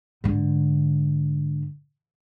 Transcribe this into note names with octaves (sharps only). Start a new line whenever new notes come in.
G#2 D3